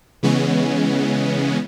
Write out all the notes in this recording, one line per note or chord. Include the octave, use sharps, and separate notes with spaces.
C#3 E3 G#3 B3 C#4